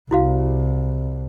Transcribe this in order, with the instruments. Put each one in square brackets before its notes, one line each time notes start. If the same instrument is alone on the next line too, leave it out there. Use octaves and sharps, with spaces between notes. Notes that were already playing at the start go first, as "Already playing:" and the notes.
[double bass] C2 [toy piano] E4 F#4 F5